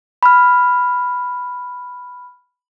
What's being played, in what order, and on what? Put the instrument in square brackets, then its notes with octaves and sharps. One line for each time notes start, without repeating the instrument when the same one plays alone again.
[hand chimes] B5 F6